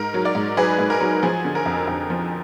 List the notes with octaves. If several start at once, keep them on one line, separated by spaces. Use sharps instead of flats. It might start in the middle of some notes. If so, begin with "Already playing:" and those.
Already playing: G#2 A#4
F#3
A#4 D5
G#2
F#3 G#4 B4
G#2
A#4
F#3
F3 G#4
D3
A#4
F2
F2
F3